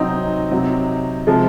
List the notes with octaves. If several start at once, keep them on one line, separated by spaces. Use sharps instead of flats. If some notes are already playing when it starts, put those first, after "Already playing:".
Already playing: C3 F#3 C4 D#4
C3 F#3
C3 F3 G#3